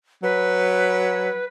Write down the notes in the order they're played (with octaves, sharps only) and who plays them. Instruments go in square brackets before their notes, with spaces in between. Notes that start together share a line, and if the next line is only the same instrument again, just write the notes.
[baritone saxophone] F#3 [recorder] B4